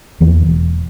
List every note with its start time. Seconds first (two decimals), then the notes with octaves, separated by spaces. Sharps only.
0.21 E2 E3 F3 A#3
0.46 E1